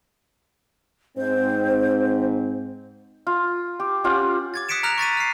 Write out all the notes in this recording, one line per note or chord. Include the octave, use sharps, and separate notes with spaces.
G#2 C4 C5
F4
G4
C#4 F4 G4 F#5
D6 G#6 A6
D#6 F#6 B6 C#7 D7 E7
A#5 D#6 F6 F#6 A#6 F7
C#6 A6 B6 D#7
F6 C7